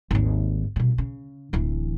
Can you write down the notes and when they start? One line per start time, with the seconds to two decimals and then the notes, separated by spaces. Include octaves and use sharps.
0.11 G#1 D#2
0.76 C2 B2
0.98 C#3
1.53 D1 E3